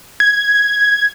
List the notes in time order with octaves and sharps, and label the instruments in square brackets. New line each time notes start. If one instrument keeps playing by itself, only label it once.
[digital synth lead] G#6